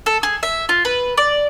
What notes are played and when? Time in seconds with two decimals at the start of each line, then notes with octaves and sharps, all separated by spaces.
0.06 A4
0.23 G#4
0.43 E5
0.69 F4
0.85 B4
1.17 D5